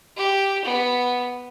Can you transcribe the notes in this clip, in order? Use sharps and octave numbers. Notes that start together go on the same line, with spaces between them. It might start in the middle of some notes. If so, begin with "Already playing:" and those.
G4
B3